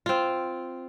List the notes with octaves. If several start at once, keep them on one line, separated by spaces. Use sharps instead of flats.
C4 F4